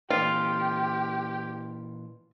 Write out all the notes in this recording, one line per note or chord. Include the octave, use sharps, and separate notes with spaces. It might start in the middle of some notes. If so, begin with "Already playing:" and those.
A#2 E3 F4 G4